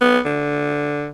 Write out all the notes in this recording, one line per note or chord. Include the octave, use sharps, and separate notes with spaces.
B3
D3